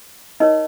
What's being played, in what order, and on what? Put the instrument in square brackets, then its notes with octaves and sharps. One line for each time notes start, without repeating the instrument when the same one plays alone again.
[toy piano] D#4 A#4 C#5 D#5